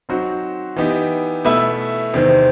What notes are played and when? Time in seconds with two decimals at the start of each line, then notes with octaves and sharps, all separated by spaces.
0.09 F#3 C4 D#4 F#4 C5
0.76 E3 B3 D#4 G4
1.45 B2 A3 E4 B4 E5
2.13 E2 C3 D#3 C5